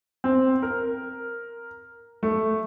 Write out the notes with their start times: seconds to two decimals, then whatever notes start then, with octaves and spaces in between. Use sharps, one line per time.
0.24 C4
0.62 A#4
2.23 A3